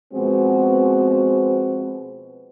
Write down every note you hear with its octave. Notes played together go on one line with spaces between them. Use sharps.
B2 F3 G#3 B3 C4 F#4